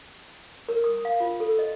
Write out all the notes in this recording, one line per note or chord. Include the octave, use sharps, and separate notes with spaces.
A#4
D#6
F5
F4
A4
D#5